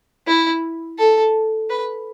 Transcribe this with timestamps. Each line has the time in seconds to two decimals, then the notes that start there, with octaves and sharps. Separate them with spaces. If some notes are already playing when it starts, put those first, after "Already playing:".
0.27 E4
0.98 A4
1.70 B4